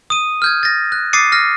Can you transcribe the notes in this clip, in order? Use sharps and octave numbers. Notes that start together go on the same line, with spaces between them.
D#6 D#7
F6 G6 G#6
A6 A#6
F#6
D6 D#6 A6 C7 C#7 D#7
F6 A#6